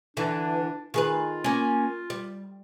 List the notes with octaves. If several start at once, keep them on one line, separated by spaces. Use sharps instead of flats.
D3 E3 D4
D#3 F4 G#4 B4
A#3 C#4
G3